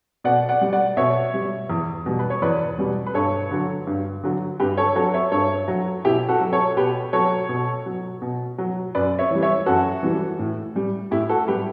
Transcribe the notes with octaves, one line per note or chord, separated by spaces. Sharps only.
B2 D5 F#5
D5 F#5
G3
D5 F#5
B2 C#5 E5
G3
E2
B2 G3
B4
C#5
E2 B4 D5
B2 G3
B4
G2 A4 C#5
D3 F#3
G2
D3 F#3
G2 G4 B4
A4 C#5
F#3 A4 C#5
C#5 E5
G2 A4 C#5
F#3
B2 E4 G4
F#4 A4
F#3
A4 C#5
B2 G4 B4
F#3 A4 C#5
B2
F#3
B2
F#3
F#2 B4 D5
C#5 E5
E3 G3
C#5 E5
F#2 F#4 A4
E3 G3
A2
G3
A2 E4 G4
F#4 A4
G3 G4 B4